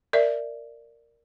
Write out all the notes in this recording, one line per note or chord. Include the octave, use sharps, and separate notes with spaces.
A#4 D5 E5